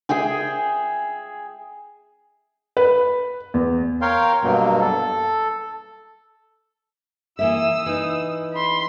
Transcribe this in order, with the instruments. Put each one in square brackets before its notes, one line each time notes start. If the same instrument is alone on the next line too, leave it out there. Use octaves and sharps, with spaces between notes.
[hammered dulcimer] G#4 E5 G5 G#5
[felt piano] B4
E2
[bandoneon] A#4 C#5 F5 G5 C6
G2 B2 F#3 A#3
A4
[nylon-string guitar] E3 A#3 E5 [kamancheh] D#6 E6
[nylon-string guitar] E3 D#4
[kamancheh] B5 C6